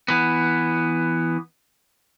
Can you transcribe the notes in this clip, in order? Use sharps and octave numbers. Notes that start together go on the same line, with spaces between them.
E3 B3